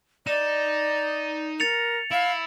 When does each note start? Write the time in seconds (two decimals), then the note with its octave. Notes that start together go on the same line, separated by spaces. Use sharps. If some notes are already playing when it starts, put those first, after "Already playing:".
0.27 D#4 D5 E7
1.60 A#4 A6 C#7 F7
2.11 E4 F5